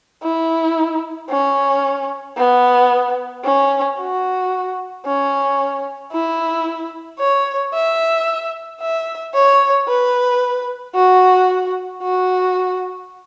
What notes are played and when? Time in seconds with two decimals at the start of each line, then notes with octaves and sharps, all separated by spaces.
0.23 E4
1.30 C#4
2.37 B3
3.44 C#4
3.98 F#4
5.06 C#4
6.12 E4
7.19 C#5
7.74 E5
8.81 E5
9.34 C#5
9.88 B4
10.95 F#4
12.02 F#4